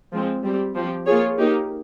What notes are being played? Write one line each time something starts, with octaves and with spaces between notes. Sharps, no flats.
F3 G#3 C4
G3 C4 G4
F3 C4 G4
A#3 F4 G#4 C#5
A#3 D#4 G4